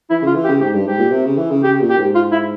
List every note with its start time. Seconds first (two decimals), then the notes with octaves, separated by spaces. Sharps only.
0.10 E3 E4
0.22 C#3
0.27 F4
0.35 E3
0.44 G4
0.48 C#3
0.61 G#2 G4
0.74 G2
0.86 G#2 G4
0.99 A#2
1.12 C3
1.26 C#3
1.37 E3
1.51 C#3
1.63 C#3 G4
1.81 A#2
1.90 G4
1.97 G#2
2.15 F4
2.32 E4